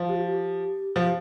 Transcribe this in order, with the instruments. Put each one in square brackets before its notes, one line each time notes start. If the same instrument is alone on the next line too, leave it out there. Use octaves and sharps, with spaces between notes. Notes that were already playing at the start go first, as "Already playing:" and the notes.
Already playing: [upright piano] F3
[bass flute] G4
F4
G4
[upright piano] F3